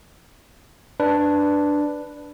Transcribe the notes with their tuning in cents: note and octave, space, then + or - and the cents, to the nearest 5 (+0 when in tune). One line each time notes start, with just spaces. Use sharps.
D4 +0 B4 +0